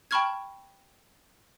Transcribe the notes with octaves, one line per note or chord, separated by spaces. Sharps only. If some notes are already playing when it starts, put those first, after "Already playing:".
G5 A5 B5 C#6 F6 G#6